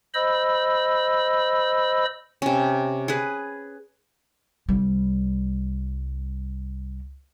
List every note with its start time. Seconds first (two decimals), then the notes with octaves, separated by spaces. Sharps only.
0.14 C5 D#5 B5 E6
2.42 C3 C#4
3.08 G#4 B4
4.69 C2 G3